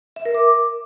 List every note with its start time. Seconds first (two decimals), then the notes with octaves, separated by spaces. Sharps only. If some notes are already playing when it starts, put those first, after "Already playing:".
0.16 E5
0.25 A#4
0.35 D6